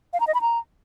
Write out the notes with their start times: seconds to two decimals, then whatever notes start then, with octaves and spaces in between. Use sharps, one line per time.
0.13 F5
0.20 A#5
0.27 D#5
0.34 B5
0.41 A#5